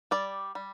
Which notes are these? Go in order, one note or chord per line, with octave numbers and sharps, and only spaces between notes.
G3 D5
G3